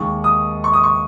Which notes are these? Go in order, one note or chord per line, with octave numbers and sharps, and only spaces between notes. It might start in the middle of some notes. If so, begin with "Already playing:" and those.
Already playing: D#2 D#3 G#3 C#6
D#6
C#6
D#6
C#6